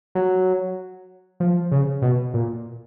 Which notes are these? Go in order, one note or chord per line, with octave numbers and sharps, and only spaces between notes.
F#3
F3
C#3
B2
A#2